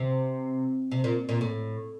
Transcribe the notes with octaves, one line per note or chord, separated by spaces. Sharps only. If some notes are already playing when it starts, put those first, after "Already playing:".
Already playing: C3
C3
A#2
A#2
A2